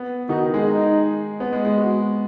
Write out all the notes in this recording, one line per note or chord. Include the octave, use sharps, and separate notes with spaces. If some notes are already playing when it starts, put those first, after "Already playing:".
Already playing: B3
D#3 D#4 F#4
G#3 G#4
D#4
B3
G#3
G#3
F#4